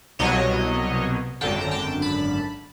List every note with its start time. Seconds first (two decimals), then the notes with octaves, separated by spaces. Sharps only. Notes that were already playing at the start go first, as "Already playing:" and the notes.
0.19 C2 B2 F#3 C#5 D#5
1.41 G#1 F#2 D3 G5 A5
1.61 A#5
1.71 G5 A5
2.02 A5 B5